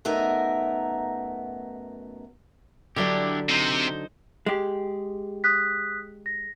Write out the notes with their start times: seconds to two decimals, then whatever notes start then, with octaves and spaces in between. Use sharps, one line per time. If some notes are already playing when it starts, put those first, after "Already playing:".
0.05 F#2 A3 B3 D#4 A#4 E5
2.96 D3 F#3 D4 E4 G4 D5
3.49 C3 D#4 C5
4.46 G#3 G4
5.44 D#6 F#6 B6
6.26 A#6